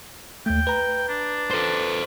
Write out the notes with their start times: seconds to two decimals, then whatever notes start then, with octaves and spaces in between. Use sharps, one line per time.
0.46 D#2 A3 G5
0.67 B4 A#5
1.08 D4
1.51 A4 C5